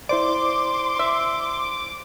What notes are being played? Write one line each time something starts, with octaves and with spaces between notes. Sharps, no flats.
E4 C5 D5 C6 D6
E5